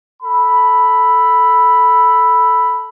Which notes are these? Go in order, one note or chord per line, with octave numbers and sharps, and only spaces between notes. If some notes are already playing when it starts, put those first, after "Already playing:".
A4 B5